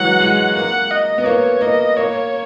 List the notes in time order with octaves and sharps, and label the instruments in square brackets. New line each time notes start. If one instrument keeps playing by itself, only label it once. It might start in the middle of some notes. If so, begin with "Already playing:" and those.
Already playing: [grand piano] E3 F#3 G#3 [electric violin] F#5
[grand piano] G#3
[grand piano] A#3 [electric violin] F#5
[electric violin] D#5
[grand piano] B3
[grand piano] A#3 [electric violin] C#5
[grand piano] A#3 [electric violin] D#5
[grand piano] A#3 [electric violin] C#5